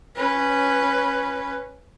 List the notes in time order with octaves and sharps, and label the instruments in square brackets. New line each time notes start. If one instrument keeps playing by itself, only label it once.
[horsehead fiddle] C#4 B4